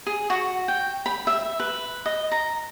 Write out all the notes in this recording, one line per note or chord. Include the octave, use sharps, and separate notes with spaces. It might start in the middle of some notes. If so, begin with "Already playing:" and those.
G#4
F#4
G5
B5
E5
B4
D#5
A#5